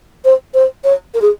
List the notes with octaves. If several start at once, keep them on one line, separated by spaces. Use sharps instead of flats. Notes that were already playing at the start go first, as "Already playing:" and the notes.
C5
C5
C#5
A#4
G#4